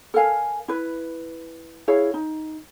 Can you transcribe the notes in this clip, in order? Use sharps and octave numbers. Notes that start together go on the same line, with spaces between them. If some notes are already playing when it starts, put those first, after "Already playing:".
A4 A#4 F5 G#5
E4 B4
E4 G#4 C#5 F5
D#4